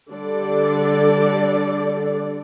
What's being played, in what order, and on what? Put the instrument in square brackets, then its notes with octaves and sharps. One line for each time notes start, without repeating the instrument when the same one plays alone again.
[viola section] D3 G3 D4 A4 D5